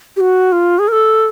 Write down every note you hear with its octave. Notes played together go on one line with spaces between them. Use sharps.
G4
F#4
F4
G#4
A#4
A4